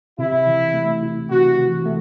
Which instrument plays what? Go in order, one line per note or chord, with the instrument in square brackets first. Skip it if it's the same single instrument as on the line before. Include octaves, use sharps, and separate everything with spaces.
[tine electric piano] C3 [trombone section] E4
[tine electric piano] E3
A3
E4
[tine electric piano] C3 [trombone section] F#4
[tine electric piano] E3
A3